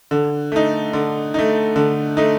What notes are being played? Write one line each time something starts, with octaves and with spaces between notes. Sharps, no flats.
D3
A3 D#4
D3
A3 D#4
D3
A3 D#4